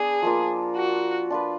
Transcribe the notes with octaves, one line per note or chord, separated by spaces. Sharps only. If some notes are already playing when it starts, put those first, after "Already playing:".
Already playing: B3 D4 G#4
F3 A#3 F4
F#4
D4 F4 B4